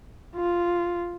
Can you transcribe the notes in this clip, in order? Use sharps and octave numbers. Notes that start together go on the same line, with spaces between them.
F4